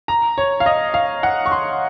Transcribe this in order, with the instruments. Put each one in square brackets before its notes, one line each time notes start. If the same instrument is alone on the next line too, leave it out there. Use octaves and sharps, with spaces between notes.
[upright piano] A#5
C#5
F5
D#5
F5
F#5
C#6
C6